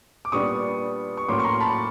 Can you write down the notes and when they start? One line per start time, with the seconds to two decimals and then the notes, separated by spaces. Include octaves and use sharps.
0.25 D6
0.32 A#2 G3 B3 D4 C#6 D#6
1.17 C#6
1.28 A2 F#3 A#3 C#4 C6 D6
1.39 C#6
1.44 A#5 C6
1.60 A5 B5